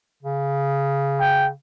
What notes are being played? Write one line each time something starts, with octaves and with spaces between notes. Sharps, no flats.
C#3
G5